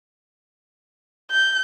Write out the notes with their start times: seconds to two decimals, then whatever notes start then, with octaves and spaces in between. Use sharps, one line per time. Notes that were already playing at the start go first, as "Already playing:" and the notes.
1.31 G6